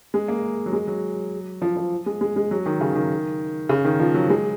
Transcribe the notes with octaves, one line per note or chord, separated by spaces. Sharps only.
G#3
A#3
F#3
G#3
F#3
F3
F3
G#3
G#3
G#3
F#3
D#3
C#3
D#3
C#3
D#3
F3
F#3
G#3